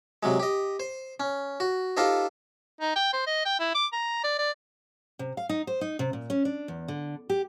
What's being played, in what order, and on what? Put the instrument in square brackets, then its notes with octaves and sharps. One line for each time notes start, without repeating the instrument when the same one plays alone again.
[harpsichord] C3 F#3 G#3
G4 D#5
C5
C#4
F#4
D#4 F4 G4 A4 C5 D#5
[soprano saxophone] D#4
G5
C5
D#5
G5
E4
D6
A#5
D5
D5
[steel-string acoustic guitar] C3
F5
D#4
C5
D#4
C3
A#2
C#4
D4
E2
D3
G4